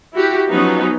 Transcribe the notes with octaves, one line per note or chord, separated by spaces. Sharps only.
E4 F#4 G4
F3 F#3 B3 C#4 D#4